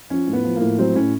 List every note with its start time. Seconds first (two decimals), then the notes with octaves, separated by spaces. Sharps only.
0.10 F3 C#4
0.27 A2
0.33 B3
0.44 F3
0.56 A2 A#3
0.79 F#3 C4
0.95 A2 C#4